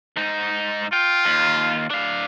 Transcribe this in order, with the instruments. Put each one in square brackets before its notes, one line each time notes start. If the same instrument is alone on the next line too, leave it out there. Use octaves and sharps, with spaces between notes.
[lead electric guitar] G#2 D#4
[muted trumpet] F4 [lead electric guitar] G5
[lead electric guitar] D#2
D4 F5